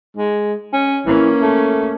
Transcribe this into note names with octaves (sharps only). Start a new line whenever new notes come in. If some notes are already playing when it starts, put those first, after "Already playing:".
G#3
C#4
E3 A#3 C#4
A3